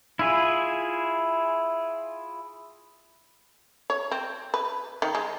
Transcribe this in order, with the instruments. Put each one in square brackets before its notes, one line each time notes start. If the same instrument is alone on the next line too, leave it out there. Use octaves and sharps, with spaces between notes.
[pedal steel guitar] E4 F4 G#4
[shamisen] C#5
C4
B4
D#3
G#3